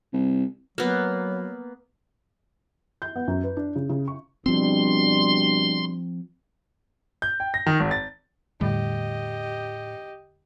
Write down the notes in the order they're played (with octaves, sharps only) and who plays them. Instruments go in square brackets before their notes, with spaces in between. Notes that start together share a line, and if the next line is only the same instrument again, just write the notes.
[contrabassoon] C2
[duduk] F#3 [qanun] A#3 B3
[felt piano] G6
B3
F#2
B4
D4
C#3
C#3
C#6
[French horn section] B2 G3 D4 [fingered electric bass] F3 C4 [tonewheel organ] C6
[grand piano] G6
G5
A#6
D#3
G#1
A6
[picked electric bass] E2 D3 G3 [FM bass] A2 [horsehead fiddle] G4 D#5